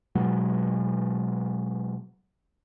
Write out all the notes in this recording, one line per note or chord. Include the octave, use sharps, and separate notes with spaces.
B2 F#3 G#3